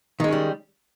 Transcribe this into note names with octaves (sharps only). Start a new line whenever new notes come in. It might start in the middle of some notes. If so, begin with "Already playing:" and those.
D#3 G3 G#3 C#4